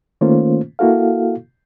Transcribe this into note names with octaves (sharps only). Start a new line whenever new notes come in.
D#3 A3 A#3 C#4 F4 C5
A#3 E4 F#4 A4 F5